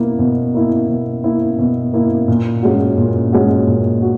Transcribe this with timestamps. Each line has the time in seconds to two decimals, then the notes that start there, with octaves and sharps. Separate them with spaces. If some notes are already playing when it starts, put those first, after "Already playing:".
Already playing: B2 A#3 E4
0.19 B2
0.55 A#3 E4
0.89 B2
1.24 A#3 E4
1.59 B2
1.94 A#3 E4
2.28 A#2
2.63 G#3 C#4 F#4
2.98 A#2
3.33 G#3 C#4 F#4
3.67 A#2
4.02 F#4